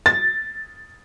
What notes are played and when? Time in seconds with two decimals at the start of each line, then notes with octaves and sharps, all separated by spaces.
0.06 A6